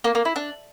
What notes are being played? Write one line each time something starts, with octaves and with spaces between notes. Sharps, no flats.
A#3
A#3
E4
D4